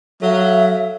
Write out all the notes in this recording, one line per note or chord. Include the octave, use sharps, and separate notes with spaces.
F#3 A4 E5 F5